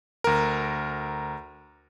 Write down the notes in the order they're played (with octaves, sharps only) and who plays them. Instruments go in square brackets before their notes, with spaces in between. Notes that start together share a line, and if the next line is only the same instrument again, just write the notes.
[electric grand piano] D2 A#4